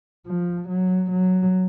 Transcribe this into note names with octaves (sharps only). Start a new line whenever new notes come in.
F3
F#3
F#3